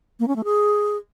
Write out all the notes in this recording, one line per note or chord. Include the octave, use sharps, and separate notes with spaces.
A#3
C#4
A3
G#4